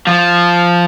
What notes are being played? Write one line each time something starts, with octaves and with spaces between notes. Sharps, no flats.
F3